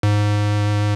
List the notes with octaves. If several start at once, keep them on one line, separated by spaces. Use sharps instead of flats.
G#2